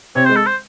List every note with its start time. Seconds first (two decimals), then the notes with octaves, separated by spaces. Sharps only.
0.15 C3 C4 C#5
0.26 G#3 C5
0.36 A4
0.46 C5